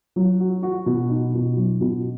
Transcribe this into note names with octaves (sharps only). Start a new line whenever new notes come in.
F#3
F#4
F#4
B2
D#4
B2
F#3
B2